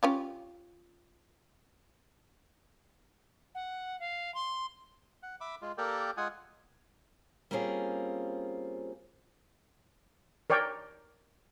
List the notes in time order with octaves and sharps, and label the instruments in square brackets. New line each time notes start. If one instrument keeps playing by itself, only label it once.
[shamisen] C#4 F4 G4
[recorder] F#5
F5
C6
[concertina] F#5
E5 B5 D6
G#3 F4
A#3 G4 A4 A#4 D5 G5
G#3 F4 F#5 G#5 D#6
[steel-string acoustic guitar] G3 A#3 C4 C#4 F4 G#4
[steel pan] A#4 C#5 D5 G5